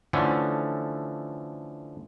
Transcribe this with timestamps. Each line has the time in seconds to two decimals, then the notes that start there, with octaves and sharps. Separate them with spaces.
0.13 D3 E3 F3 A3 C#4